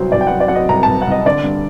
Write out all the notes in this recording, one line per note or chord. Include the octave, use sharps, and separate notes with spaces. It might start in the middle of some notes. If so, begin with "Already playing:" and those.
Already playing: C2 F#3 C5
C2 D5
G5
F#3 F#5
D5
F#3 F#5
D#5
C2 A#5
C2 A5
F#5
C2 D#5
D3 D5
G2